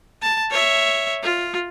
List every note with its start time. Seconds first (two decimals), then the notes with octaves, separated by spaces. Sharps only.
0.22 A5
0.51 C#5 E5
1.23 F4